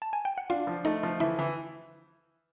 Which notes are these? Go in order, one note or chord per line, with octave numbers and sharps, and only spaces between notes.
A5
G#5
G5
F#5
D4 F4 F5
F3
A3 D#4 D#5
F3
E3 E4 E5
E3